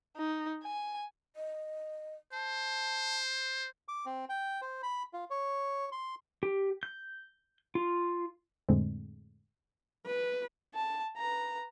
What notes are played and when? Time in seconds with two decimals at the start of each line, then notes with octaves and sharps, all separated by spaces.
0.17 D#4
0.63 G#5
1.36 D#5
2.33 C5 A5
3.88 D6
4.06 C4
4.29 G5
4.62 C5
4.83 B5
5.13 F4
5.30 C#5
5.92 C6
6.43 G4
6.83 G6
7.75 F4
8.69 F2 A2 D3 G#3 C4
10.06 B4
10.75 A5
11.17 B4 A#5